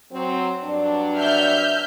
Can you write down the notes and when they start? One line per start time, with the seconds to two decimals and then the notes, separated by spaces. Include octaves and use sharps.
0.12 F#3 C4
0.64 G2 F#3 D4
1.17 E5 F6 G6